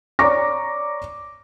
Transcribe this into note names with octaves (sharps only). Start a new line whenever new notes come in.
C#5 D5 A#5 C#6 D6 A#6